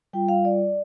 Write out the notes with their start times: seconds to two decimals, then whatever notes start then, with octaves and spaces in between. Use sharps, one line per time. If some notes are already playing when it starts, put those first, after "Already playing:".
0.13 G3 F4 G5
0.29 F5
0.45 D5